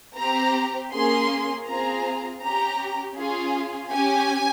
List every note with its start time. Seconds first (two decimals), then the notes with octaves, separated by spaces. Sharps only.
0.17 C4 G4 A#5
0.92 A#3 C#4 G#4 C6
1.66 C4 F4 G#4 A#5
2.42 C#4 G4 A#5
3.16 C#4 F4 G#4
3.90 C#4 G4 G#5